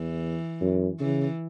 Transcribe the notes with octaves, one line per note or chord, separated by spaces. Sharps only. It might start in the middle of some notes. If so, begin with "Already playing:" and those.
Already playing: E2 E3
F#2
C#3 E3